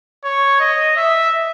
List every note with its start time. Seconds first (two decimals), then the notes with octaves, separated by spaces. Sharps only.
0.24 C#5
0.60 D#5
0.97 E5